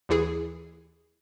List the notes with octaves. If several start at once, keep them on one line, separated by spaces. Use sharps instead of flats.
D#2 E3 E4 G#4